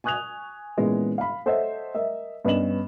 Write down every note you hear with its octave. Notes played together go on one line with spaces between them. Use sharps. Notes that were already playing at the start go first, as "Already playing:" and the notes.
G#5 C#6 D#6 F#6 G#6 F7
A#2 E3 G#3 B3 C#4
F5 B5
A4 C5 C#5 D#5 E5 F#5
A#4 D#5 E5
G2 B3 C#4 D#5 E7 F#7